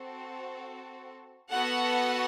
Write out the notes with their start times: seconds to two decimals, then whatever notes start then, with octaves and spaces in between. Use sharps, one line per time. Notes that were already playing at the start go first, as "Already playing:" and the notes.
Already playing: C4 F#4 A4
1.50 B3 F#4 A4 F#5